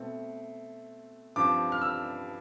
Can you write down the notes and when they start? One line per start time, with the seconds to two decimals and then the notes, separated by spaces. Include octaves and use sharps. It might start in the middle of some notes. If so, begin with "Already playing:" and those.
Already playing: B2 A3 C4
1.36 G2 F3 C4 D6
1.72 F6
1.81 E6